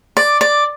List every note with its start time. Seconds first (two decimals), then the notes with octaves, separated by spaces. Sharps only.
0.17 D5
0.41 D5